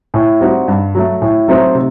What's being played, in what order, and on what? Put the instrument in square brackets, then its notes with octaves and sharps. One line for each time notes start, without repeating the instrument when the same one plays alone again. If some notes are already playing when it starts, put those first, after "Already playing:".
[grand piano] A2
G3 C4 D#4 F#4
G2
F#3 A3
A2
F#3 A3 C4 D#4
C3